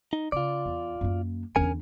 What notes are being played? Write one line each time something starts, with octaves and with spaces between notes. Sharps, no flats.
D#4
C#3 F4 D5
E2
F#2 A#3
E2 D3 C#4 A#4 G#5